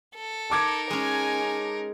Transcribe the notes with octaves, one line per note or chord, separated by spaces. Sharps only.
A4
D#4 A#4 A5 D6 G#6
G#3 C#4 G#5